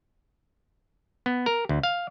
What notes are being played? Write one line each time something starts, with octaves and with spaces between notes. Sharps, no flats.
B3
A#4
D2
F5